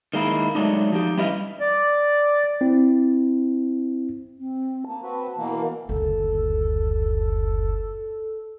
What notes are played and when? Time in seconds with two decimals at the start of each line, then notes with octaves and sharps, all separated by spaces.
0.14 D#3 G#3 A#3 E4
0.55 F#3 G#3 A3 D4 D#4
0.92 F3 D#4 G4
1.17 G3 C#4 E4 B4 D#5 F5
1.60 D5
2.61 C4 E4
4.39 C4
4.87 A#3 A5
5.02 C4 F#4 B4
5.38 B2 E3 A#3
5.50 A#4
5.89 F#1 D2 A4